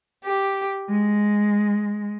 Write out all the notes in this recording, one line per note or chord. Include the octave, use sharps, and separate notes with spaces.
G4
G#3